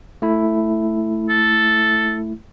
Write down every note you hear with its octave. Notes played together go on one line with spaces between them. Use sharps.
A3 E4
A4